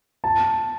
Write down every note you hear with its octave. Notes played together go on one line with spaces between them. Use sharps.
A5